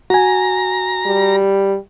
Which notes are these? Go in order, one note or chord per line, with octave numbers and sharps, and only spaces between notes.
F#4 G#5 A#5
G3